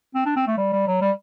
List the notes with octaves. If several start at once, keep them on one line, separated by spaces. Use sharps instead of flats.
C4
D4
C4
A3
G3
G3
F#3
G3